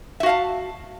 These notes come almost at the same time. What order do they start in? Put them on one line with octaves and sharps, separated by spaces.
E5 F#4 F5 A5